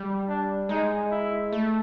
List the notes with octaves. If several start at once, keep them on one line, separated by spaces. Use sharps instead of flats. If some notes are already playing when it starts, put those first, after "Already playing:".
Already playing: G3
D4
G#3 D#4
E4
A3